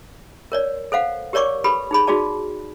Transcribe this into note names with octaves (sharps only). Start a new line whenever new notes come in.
A#4 C#5 D5
A4 C5 F5 F#5
G4 A#4 C#5 D5 C#6 D6
G4 A4 B4 B5
D#4 G#4 B5
D#4 F#4 G#4 D5 A5